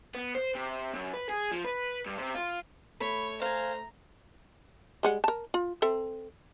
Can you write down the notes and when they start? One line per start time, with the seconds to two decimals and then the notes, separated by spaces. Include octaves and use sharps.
0.15 B3
0.35 C5
0.55 C3
0.94 F#2
1.14 B4
1.29 G#4
1.52 F3
1.65 B4
2.06 G2
2.18 C3
2.34 F4
3.00 A3 C#5 B5
3.42 C5 F5 G#5 A#5
5.03 G3 G#3 F#5
5.24 A#4 A5
5.54 F4
5.82 C4 A4 E5